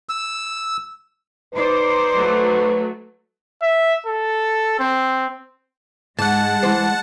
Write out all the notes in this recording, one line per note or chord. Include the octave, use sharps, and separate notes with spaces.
E6
D#4 B4 C5 D5
F#3 A3
E5
A4
C4
G#2 G#3 F#5 A5
E3 C5